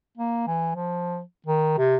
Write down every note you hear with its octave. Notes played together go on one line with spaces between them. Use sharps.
A#3
E3
F3
D#3
C3